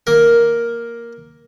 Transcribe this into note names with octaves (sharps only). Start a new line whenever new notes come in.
A#3 A#4